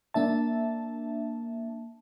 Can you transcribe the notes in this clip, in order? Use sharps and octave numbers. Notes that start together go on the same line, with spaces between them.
A#3 D4 E5 A5